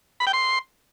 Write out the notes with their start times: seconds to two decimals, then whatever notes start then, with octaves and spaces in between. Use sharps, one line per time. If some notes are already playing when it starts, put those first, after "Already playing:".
0.20 B5
0.27 G5
0.33 C6